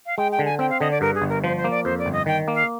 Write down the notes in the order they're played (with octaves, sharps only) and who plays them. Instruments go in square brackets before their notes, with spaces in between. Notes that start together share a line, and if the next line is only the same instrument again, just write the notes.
[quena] F5
[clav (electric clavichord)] G#3 [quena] G5
[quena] G5
[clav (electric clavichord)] D3
[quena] G#5
[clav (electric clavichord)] C4 [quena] G5
[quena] F5
[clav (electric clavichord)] D3 [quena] D#5
[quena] D5
[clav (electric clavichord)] G2 [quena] A#4
[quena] G#4
[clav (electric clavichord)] G1
[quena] A#4
[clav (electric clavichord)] F3 [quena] C5
[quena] C5
[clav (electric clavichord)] A#3
[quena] D5
[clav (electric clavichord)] F2 [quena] C5
[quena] D5
[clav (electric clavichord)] G1
[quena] D#5
[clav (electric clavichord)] D#3 [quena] G5
[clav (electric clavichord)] A#3
[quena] F5